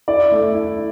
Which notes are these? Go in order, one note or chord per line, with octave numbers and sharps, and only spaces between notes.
E4 D5
A3
E4